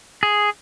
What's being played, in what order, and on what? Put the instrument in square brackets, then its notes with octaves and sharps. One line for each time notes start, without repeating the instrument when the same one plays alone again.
[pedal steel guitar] G#4